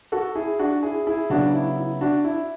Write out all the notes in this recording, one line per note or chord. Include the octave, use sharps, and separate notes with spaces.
F#4 A4
E4 G#4
D4 F#4
E4 G#4
E4 G#4
C#3 F#3 B3 D4 F#4
E4
E4
D4 F#4
E4